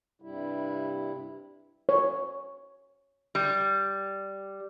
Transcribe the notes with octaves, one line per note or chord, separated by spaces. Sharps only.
G2 C3 G3 E4
C#5
G3